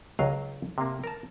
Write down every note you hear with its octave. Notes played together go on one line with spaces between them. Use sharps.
C#2 F#3 A#4 D#5 F5
C3 A#3
A#4 A5